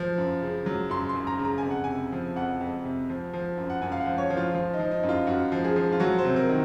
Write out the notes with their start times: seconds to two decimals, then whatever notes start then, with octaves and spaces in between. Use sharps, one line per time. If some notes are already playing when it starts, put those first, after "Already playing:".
Already playing: F3
0.18 F#2
0.42 C#3
0.66 F#3
0.90 F#2 C6
1.09 C6
1.15 F#2
1.27 A#5
1.39 C#3
1.45 A#5
1.58 F2 G#5
1.71 F#5
1.84 C3 G#5
2.12 F3
2.36 F2 F#5
2.61 F2
2.85 C3
3.09 F3
3.33 F3
3.58 F#2
3.70 F#5
3.82 F#2 G#5
3.92 F5
4.00 F#5
4.06 F3
4.18 C#5
4.30 F3
4.37 F4
4.54 F3
4.73 D#4
4.79 F3
4.91 D#4
5.03 F#2
5.09 F4
5.27 F#2 F#4
5.52 F3
5.65 G#4
5.76 F3
5.92 F4
6.00 F#3 F#4
6.18 C5
6.25 C3
6.36 A#4
6.49 D#3